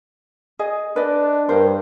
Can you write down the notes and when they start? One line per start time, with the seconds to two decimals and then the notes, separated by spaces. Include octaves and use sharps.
0.59 G#4 D#5
0.96 D4 B4 D5 D#5
1.49 G2 A#4 C5